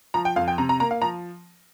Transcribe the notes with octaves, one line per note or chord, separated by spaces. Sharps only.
F3 A#5
G5
F2 F5
G5
C3 A#5
A#5
A#3 A#5
F5
F3 A#5